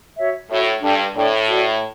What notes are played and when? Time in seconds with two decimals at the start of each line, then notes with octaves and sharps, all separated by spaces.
0.18 F#4 C#5 E5
0.50 A2 F#4 C#5 E5
0.82 G2 D4 A4 D5 G5
1.15 A2 D4 A4 D5 G5
1.47 F#4 A4 D5